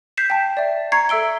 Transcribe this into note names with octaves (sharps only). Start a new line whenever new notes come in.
G6 B6 C7 E7
G5 A5
D5 E5
A#5 C#6 G#6 C7 C#7
A4 E5 E6 D7 G7